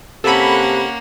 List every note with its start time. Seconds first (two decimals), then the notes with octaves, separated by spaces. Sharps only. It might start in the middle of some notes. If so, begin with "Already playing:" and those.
0.24 C3 A#3 C#4 A4 F#5 B5